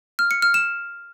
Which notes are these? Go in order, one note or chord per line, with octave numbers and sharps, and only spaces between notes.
F6
C#7
F6
E7